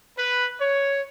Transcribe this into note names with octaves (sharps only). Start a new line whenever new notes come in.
B4
C#5